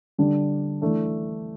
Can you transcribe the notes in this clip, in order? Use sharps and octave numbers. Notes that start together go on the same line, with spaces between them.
D3 G3 D4
E3 A3 D4